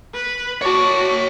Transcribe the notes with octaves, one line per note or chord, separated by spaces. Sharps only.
B4
F#4 C#5 D5 A5